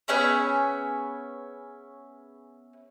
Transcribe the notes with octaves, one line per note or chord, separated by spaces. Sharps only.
B3 C#4 G#4 E5